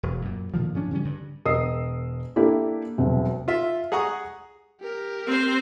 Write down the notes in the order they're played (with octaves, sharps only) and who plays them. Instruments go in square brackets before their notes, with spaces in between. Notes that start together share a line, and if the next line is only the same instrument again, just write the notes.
[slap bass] E1
F#2 A#2
A#2 D3 D#3 F3
G#2 F3 C#4 D4
C#3 E3 G3 C#4
G2 D3
[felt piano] E1 A#4 D#5 D#6 E6 C7
A#3 D4 E4 G4 A4 A#4
E1 C2 F#3
[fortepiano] F4 E5
G#4 F#5 A#5 C#6 D#6
[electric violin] G4 A#4
[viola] C4 C5